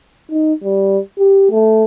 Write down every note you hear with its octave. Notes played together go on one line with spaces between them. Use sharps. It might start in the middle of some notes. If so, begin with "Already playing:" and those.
D#4
G3
G4
A3